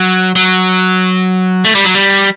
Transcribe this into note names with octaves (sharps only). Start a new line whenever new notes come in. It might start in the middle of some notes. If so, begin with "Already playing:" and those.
Already playing: F#3
F#3
A3
G3
F#3
G3